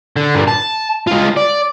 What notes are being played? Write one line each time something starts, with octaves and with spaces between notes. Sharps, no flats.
D3
G2 A#2
A5
G#3 F4
D5